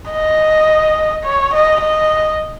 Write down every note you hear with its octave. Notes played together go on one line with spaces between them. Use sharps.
D#5
C#5
D#5
D#5